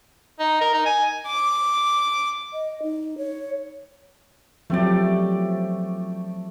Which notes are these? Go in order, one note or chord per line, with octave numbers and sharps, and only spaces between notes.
D#4
A#4
D#4
G#5
D6
D#5
D#4
C#5
F3 F#3 A3 C4 G4 D5